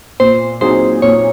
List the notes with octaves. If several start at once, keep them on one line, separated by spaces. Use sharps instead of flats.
A#2 C5
F#3 C4 D#4 G#4 C5
A#2 C#5